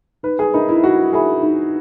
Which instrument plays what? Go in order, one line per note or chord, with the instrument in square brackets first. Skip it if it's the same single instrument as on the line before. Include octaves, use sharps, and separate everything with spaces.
[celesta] D#4 [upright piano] B4
[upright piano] G#4
[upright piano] D#4 [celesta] A#4 E5 B5
[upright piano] E4
[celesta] D#4 [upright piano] F#4
[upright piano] G#4 [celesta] A#4 E5 B5
[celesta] D#4